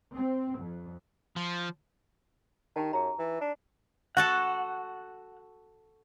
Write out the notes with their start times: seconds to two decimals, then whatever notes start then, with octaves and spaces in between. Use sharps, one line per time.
0.15 C4
0.59 F2
1.36 F3
2.76 D#3 D#4 G4 A5
2.93 F#2 G#4 A#5
3.19 E3
3.41 D4
4.17 F#4 A4 F#5 A5